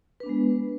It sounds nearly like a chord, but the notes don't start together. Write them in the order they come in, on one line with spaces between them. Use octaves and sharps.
B4 D4 B3 G#3